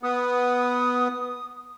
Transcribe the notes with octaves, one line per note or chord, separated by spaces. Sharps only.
B3 D#6